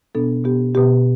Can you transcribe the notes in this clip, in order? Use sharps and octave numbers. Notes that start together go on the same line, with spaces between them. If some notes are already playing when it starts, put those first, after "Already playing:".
B2 B3 D4 A4
B2 B3 G4
B2 B3 G4